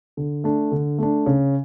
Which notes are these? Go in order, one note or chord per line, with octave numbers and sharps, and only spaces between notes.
D3
A3 D4
D3
A3 D4
C#3